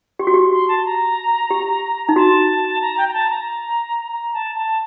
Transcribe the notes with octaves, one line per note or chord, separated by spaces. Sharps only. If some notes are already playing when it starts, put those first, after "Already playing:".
G4 C6
F#4
G4
C6
A5
A#5
G4
D#4
F#4 A5
A#5
G5
A#5
A5
A#5
A#5
A5
A5